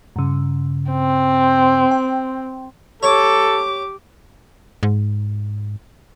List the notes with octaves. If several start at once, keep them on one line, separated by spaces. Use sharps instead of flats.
G2 C#3
C4
G5
G4 A4 C#5 D6
G#2